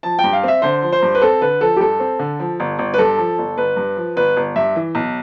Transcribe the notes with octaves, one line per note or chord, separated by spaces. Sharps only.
F3 A5
G5
G2
F5
C4 E5
D3 C5
F3
C5
G2
B4
C4 A4
D3 B4
F3 A4
G4
G2 A4
C4
D3
F3
G1
G1
B4
G2 A4
F3
G1
G1 B4
G2
F3
G1 B4
G1
G2 E5
E3
B1